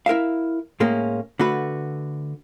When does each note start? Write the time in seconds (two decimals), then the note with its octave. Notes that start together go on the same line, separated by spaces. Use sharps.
0.06 E4 A#4 E5 F5
0.80 A2 G#3 A#3 C#4
1.39 D3 A3 F#4 B4